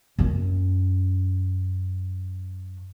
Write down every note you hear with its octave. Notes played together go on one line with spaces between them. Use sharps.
F#2 C#4